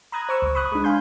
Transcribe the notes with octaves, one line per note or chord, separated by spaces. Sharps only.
A#5 B5 D#6 F#6 G#6
C5 C#6 E6
C#2 C#6
B5 C#6 D#6 F#6
G#3 D4
F5 G#5 B5 C6 G6